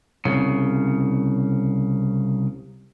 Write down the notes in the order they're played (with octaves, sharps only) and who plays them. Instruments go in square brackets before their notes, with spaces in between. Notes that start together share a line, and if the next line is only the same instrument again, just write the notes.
[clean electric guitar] C2 C#3